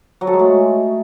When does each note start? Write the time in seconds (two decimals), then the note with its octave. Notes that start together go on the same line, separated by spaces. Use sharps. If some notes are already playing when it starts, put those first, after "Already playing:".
0.21 F#3
0.27 A4
0.33 G#3
0.39 A3